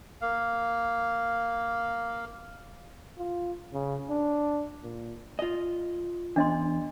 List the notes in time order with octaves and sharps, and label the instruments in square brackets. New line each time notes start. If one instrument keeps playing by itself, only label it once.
[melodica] A#3 F5
[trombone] F4
C#3
D4
A#2
[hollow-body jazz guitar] F4 D#5
[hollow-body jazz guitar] E2 [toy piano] D4 D#5 C6